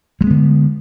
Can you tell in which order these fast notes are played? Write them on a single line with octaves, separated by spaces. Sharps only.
G3 G#3 B3 D3